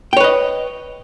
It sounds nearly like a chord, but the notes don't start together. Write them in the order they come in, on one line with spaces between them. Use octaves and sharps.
G5 C#5 B4 D#5